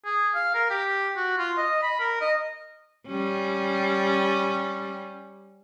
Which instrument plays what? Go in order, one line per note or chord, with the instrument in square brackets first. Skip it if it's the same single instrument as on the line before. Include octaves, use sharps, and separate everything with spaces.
[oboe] G#4
F5
A#4
G4
F#4
F4
D#5
B5
A#4
D#5
[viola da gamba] G3 C#4